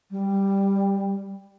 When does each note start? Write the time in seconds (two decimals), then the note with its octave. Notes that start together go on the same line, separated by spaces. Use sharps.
0.11 G3